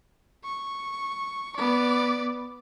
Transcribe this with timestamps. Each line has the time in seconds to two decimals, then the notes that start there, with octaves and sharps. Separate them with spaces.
0.44 C#6
1.56 B3 D5